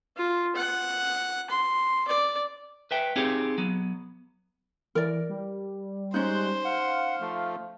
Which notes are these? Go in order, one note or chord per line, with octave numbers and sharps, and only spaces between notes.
F4
F#5
C6
D5
B4 E5 G5
C4 D#4 F4 G4 G#4 C#5
F#3 B3
E3 A#4 D5
G3
G#3 C#4 D#4 C5 F#6 G6
F5 F#5
F3 A3